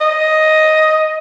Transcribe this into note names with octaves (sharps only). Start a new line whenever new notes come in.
D#5